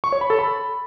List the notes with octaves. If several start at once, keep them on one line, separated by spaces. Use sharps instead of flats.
C#6
C#5
B5
A4
B5